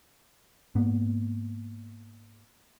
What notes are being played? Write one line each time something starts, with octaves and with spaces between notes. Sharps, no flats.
G#2 A#3 B3